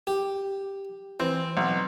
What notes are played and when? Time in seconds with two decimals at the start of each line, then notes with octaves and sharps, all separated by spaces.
0.07 G4
1.20 E3 C4
1.57 B1